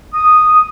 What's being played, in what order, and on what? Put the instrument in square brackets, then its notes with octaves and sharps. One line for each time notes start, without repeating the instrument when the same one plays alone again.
[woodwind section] D#6